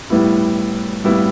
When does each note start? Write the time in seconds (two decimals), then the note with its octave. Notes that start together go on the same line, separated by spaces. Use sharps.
0.10 A2 G3 B3 E4
1.04 A2 G3 B3 E4